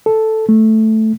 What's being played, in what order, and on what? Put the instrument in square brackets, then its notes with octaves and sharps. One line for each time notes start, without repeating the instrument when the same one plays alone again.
[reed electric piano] A4
A3